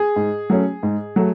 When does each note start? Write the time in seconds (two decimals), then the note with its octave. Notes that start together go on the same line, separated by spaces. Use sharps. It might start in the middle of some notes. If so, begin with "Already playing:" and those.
Already playing: G#4
0.16 G#2
0.50 F#3 A3 C#4
0.83 G#2
1.16 F#3 A3